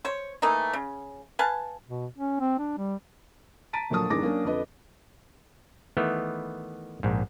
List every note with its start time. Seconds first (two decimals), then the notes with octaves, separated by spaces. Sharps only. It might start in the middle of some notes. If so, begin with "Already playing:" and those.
0.05 C5 C#5
0.42 E3 A3 A#3 D#4
0.73 C#3
1.39 B4 F5 G#5 A5
1.87 B2
2.18 C#4
2.40 C4
2.59 D4
2.78 G3
3.73 A5 A#5 A6 B6 D7 D#7
3.90 D2 A#2 F3 F#3 A5 D#6
4.10 G#1 E2 G#3 D4 D6 A#6
4.22 F#3 A#3 C#4 D4
4.45 F2 D3 B4 D#5
5.97 D#3 E3 A3 B3
7.03 A#1 G#2